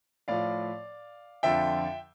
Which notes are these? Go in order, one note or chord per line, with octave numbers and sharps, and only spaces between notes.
A2 F3 D5 F5
F2 D3 F3 E5 G5